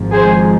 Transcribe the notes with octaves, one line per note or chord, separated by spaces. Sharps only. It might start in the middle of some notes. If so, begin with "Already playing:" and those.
Already playing: G#1 G#2 F3
G#4 C5